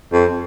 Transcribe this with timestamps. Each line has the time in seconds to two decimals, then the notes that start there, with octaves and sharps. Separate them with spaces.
0.13 F2